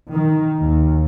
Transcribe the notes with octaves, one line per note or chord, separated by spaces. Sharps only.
D#3
D#2